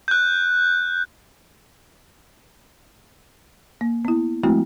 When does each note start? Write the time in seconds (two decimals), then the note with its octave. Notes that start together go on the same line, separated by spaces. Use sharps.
0.08 F#6 G6
3.81 A#3
4.05 B3 E4
4.44 F3 G#3 A3 C4 E4 F#4